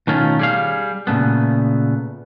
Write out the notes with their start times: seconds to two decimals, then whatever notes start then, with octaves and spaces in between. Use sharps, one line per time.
0.07 B2 D#3 A3 C#4 F4
0.39 G3 G#4 F5
1.07 A#2 C#3 A3 B3